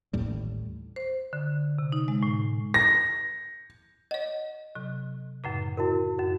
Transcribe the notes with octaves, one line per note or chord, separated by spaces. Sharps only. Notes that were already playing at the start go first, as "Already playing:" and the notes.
A1 D#2 A2 G3
C5
D3
C3
D#4
G#3
A2
A#6
C#5 D#5 F#5
C3 F#3
F#2 A2 C#3
E4 F#4 A#4
F#2 F#4